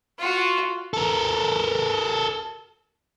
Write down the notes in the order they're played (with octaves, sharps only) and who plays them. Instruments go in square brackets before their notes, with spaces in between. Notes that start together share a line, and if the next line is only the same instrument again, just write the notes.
[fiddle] F4 F#4
[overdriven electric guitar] A4 A#4